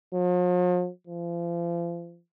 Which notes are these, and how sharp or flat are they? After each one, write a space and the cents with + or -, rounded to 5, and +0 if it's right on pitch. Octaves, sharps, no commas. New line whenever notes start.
F3 +45
F3 -35